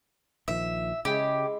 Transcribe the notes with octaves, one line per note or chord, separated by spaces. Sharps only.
A#1 D#3 F3 E5
C#3 G#3 E4 G4 G#4